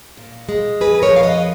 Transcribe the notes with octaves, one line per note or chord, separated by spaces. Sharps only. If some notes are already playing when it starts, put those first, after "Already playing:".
A#2
G#3
F2 G#4 B4
A#4 C#5
F3 F5
B4 D#5